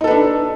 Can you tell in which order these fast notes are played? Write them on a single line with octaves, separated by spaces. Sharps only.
D#4 A4 B4 D4